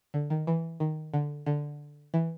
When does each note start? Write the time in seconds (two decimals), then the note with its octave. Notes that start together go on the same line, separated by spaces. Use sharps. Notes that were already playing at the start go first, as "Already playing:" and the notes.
0.14 D3
0.30 D#3
0.47 E3
0.80 D#3
1.14 D3
1.46 D3
2.14 E3